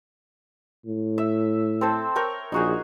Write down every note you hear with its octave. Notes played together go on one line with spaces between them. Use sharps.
A2
E5
C4 A4 C5
A#4 C#5 G5
A#1 D#4 F#4 G#4